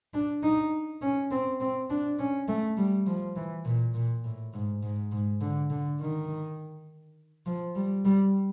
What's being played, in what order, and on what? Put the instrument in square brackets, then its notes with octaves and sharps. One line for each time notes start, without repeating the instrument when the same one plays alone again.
[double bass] D4
D#4
C#4
C4
C4
D4
C#4
A3
G3
F3
E3
A#2
A#2
A2
G#2
G#2
G#2
D3
D3
D#3
F3
G3
G3